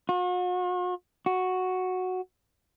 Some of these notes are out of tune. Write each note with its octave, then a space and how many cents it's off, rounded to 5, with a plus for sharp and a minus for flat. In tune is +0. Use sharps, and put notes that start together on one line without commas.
F#4 -45
F#4 -5